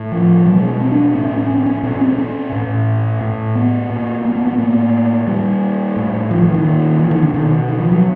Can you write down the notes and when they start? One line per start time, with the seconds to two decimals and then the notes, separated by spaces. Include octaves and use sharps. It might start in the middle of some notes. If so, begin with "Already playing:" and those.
Already playing: A2
0.12 F3
0.46 B2 F#3
0.57 G#3
0.81 C4
0.92 D4
1.15 A2 C#4
1.27 C#4
1.37 C#4
1.50 C#4
1.57 C4
1.66 C#4
1.83 A#2 C#4
2.01 C4
2.18 C#4
2.52 A2
3.21 A2
3.55 B3
3.90 A#2
4.25 A#3
4.35 B3
4.47 B3
4.58 A2 A#3
5.27 A#2 G3
5.96 A2
6.31 F3
6.42 E3
6.54 D#3
6.65 A#2
6.99 E3
7.11 D#3
7.23 D3
7.34 B2 D#3
7.69 D#3
7.81 F3
7.92 F#3